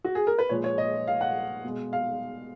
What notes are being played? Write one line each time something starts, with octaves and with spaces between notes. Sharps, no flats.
F#4
G#4
A#4
B4
A#2 F3 G#3 C#5
C#5
D#5
F5
F#5
B2 G#3
F5